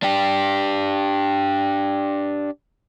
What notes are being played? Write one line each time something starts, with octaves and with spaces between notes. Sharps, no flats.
D4 G4